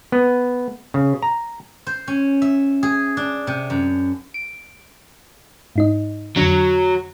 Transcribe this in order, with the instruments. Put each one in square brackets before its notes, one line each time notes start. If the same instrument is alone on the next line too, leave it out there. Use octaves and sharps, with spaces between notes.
[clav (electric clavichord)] B3
C#3
A#5
[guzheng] C5
C#4
E5
G#4
D4
C3
F#2
[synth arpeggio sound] D7
G#2 D#4 D#5
[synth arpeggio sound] F2 D3 D4 [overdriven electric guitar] F#3